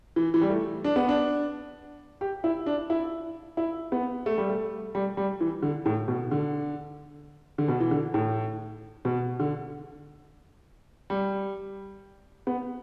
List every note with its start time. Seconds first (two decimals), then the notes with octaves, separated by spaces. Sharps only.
0.16 E3
0.34 E3
0.41 G3
0.50 A3
0.84 D4
0.96 B3
1.09 D4
2.21 G4
2.44 E4
2.66 D4
2.90 E4
3.57 E4
3.92 B3
4.26 A3
4.38 G3
4.50 A3
4.95 G3
5.17 G3
5.41 E3
5.62 D3
5.86 A2
6.08 B2
6.31 D3
7.58 D3
7.68 B2
7.80 E3
7.91 D3
8.14 A2
9.05 B2
9.40 D3
11.10 G3
12.47 B3